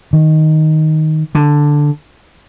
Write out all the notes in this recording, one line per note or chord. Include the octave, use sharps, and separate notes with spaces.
D#3
D3